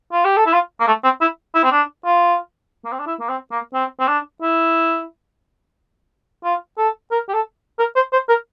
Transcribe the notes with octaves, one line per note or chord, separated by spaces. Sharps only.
F4
G4
A4
E4
F4
A#3
A3
C4
E4
E4
C4
D4
F4
A#3
C4
D4
E4
A#3
C4
A#3
C4
C4
D4
E4
F4
A4
A#4
G4
A4
A#4
C5
C5
A#4